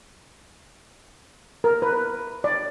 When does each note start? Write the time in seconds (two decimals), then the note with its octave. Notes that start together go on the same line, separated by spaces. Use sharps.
1.64 A#4
1.82 B4
2.44 D5